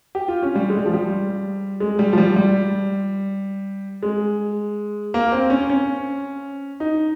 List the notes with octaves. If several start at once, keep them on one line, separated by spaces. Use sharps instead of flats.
G4
F4
C#4
G3
G#3
G3
F3
G3
G#3
G3
F3
G3
G3
G#3
A#3
C4
C#4
C#4
D#4